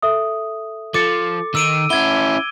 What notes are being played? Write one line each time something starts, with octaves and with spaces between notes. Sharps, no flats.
A4 E5 D#6
F3 A4 D6 A6 C#7
D#3 E6 D7 D#7
C#4 E4 F#5 G#6 G7